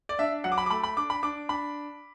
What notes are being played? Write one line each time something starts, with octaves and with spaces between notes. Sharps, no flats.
D5
D4 E5
F#3 F#5
D6
B5
D6
A3 B5
B5
D4 D6
B5
D4 D6
D4 B5